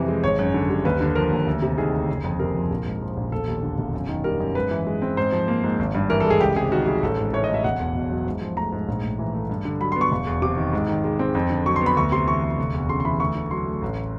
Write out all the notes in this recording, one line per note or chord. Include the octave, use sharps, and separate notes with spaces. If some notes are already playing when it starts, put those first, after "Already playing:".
Already playing: F2 C3 E3
G#3
G#1 C#5
F#2
D3
G3
D#2 B4
D3
F3 A#4
D#2
D2
C3
D#3 G#4
D2
F#1
F2
C3 A#4
F3
A#1
G#2
F3
A#1
E1 A4
D#2
D3
E1
F#2
D#3
G3 A#4
F#2
G#2 B4
E3
G#3
C4
G#2 C5
F3
A#3
G#2
G#1
G2
E3 A#4
A4
G#3
G#4
C#2 G4
C3 G#4
D#3 F#4
G3 G#4
A1 A4
G#2
E3 C#5
D#5
A3
E5
E1 F#5
E2
B2
F#3
G#2
F3
A3 A#5
G#2
A#1
A2
E3
A3
G2
D3
F#3 B5
B3 C6
C#6
E1
E2
C3 D6
D#3
G#2
D#3
G#3
C4
F2
D3
F#3 C#6
C6
B3
B5
D2 C#6
C3 C6
E3 C#6
D2
F1
E2
C#3 C6
C6
E3 B5
D2 C#6
D3
F#3 C6
A3
A1